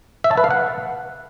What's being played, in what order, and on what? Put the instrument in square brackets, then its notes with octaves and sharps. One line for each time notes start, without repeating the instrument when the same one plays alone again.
[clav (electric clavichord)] E5
A5
B4
F5
F#5